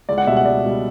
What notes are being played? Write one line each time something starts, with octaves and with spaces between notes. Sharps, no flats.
C#2 D5
F#5
B2 G3 E5
F#5
C#2 D5
B2 G3